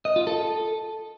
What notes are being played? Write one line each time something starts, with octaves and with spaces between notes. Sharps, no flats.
D#5
F4
A4